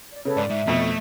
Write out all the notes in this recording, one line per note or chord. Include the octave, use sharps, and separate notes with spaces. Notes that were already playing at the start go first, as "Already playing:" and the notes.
D5
C#3 A4 B4 C#5
G#2 D5
G#2 E5
F2 B2 A3